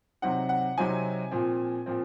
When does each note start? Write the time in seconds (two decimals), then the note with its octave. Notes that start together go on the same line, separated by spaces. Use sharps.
0.22 C3 F#3 C4 D#4 F#5
0.49 F#5
0.78 C3 F#3 C4 D#4 G#5
1.31 A#2 F3 C4
1.86 A#2 F3 C4